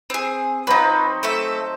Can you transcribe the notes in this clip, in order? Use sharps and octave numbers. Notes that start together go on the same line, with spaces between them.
C4 G#4
F#3 C4 D#4 F4 B4
A3 A4 E5